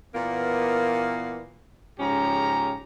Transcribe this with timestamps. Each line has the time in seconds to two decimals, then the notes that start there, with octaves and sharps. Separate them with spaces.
0.14 A#2 E3 A#3 B3
1.99 G#2 C#3 F3 C#4 G4 A#5